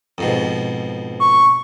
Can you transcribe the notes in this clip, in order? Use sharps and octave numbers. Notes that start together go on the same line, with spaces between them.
F2 G#2 B2
C#6